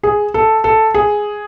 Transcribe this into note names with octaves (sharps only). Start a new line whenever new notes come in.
G#4
A4
A4
G#4